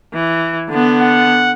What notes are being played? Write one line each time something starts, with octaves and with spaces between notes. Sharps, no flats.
E3
D3 B3
F#5